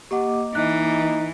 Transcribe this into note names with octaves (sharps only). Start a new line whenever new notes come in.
A#3 G4 D#5 F#5 D6
E3 D#4 F#6